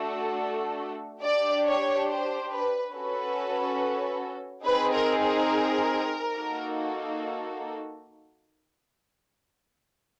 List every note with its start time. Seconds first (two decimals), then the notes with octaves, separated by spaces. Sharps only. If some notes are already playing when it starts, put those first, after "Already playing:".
Already playing: A3 D4 F#4 A4
1.23 D4 G4 D5
1.66 C#5
2.08 C5
2.51 B4
2.93 C#4 F#4 A4 B4
4.64 C4 D#4 G#4 B4
4.93 A#4
5.21 A#4
6.35 A#3 D#4 F#4 A4